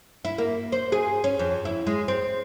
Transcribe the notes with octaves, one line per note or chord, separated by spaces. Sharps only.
E4
A#3
C5
G#4
C#4
F2
E4
G#3
C4